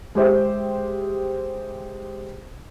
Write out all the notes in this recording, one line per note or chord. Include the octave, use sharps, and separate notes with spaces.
G#3 G4 C5 E5